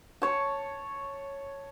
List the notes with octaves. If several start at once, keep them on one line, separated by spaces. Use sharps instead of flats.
C#5 A5